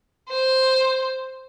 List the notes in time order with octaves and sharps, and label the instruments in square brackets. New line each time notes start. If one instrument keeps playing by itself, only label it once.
[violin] C5